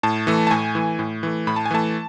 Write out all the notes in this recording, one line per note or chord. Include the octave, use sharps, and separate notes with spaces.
A2 A5
E3 A3
A5
A2 G#5
E3 A3
A2
E3 A3
A2 B5
A5
G#5
E3 A3 A5